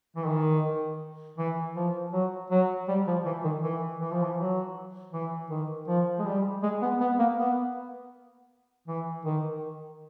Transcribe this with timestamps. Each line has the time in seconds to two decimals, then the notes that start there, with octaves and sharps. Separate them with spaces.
0.16 E3
0.26 D#3
1.38 E3
1.76 F3
2.12 F#3
2.50 F#3
2.88 G3
3.07 F3
3.26 E3
3.44 D#3
3.63 E3
4.00 E3
4.12 F3
4.23 E3
4.37 F#3
5.13 E3
5.50 D#3
5.88 F3
6.18 G#3
6.26 G3
6.63 G#3
6.82 B3
7.00 B3
7.19 A#3
7.38 B3
8.88 E3
9.25 D#3